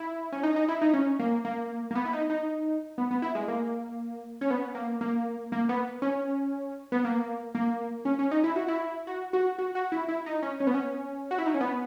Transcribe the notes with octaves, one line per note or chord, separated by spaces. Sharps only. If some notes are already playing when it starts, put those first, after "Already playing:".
Already playing: E4
C#4
D#4
D#4
E4
D#4
C#4
A#3
A#3
A#3
B3
E4
D#4
D#4
B3
B3
E4
G#3
A#3
C#4
B3
A#3
A#3
A#3
B3
C#4
B3
A#3
A#3
C#4
C#4
D#4
E4
F#4
E4
F#4
F#4
F#4
F#4
E4
E4
D#4
C#4
C#4
B3
C#4
F#4
E4
D#4
C#4
B3